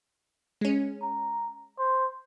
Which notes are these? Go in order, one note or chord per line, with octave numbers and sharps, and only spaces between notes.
G#3 C#4
A#5
C5